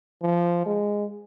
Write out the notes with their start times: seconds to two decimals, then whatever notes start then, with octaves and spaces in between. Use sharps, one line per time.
0.22 F3
0.66 G#3